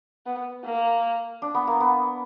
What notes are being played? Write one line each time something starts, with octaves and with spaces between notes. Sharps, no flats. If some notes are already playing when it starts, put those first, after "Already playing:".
B3
A#3
D4
B3
A#3
B3